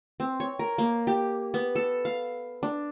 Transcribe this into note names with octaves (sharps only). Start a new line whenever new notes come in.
C4
C#5
A#4
A#3
G4
B3
A4
F5
D4